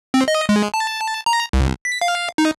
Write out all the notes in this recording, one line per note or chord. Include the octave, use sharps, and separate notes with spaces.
C4
D#5
G#3
A5
A#5
C2
B6
F5
D#4